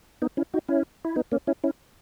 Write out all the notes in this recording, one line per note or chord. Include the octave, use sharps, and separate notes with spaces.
B3 D#4
C#4 E4
D#4 F#4
C#4 E4
E4
B3 D#4
A#3 C#4
C#4 E4
C#4 E4